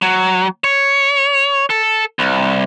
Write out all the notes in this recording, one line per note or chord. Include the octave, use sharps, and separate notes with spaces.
F#3
C#5
A4
C2